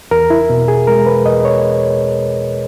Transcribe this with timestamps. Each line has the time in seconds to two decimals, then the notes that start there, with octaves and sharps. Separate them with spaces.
0.11 E2 A#4
0.30 E4
0.49 B2
0.68 G#4
0.87 G#3 A#4
1.06 B4
1.26 E2 D#5
1.45 C#5